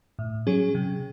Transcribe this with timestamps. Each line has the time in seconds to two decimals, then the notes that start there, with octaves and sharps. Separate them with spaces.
0.19 A2
0.47 F#3 C#4 G#4
0.75 C3